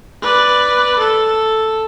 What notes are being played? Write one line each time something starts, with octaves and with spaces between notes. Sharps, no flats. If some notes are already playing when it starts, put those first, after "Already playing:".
B4 D5
A4